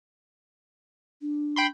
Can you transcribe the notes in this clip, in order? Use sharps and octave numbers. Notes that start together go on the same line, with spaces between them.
D4
G5 B5 C6